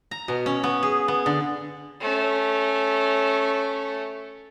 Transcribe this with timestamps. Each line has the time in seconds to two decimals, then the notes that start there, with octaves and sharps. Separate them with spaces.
0.11 A#5
0.28 B2
0.46 C#4
0.64 B3
0.83 G#4
1.08 B3
1.26 D3
2.01 A3 C#4